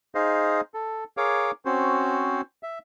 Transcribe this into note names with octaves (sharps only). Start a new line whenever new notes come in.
D#4 G#4 C5 D#5 F5
A4
G#4 A#4 C#5 F5 D6
C4 C#4 F#4 C5
E5